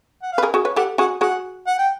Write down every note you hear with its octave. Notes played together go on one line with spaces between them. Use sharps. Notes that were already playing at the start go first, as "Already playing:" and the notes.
F#5
F5
B4
G#4 A#4
F#4 G#4
B4 C#5
G4 A4 F#5
F#4 G#4 F#5
F#4 G#4 F#5
F#5
G5